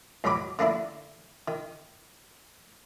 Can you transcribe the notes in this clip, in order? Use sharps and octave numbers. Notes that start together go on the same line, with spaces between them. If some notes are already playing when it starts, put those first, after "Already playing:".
D#2 G#2 F#3 B5 D6
D3 A#3 D4 E4
D#3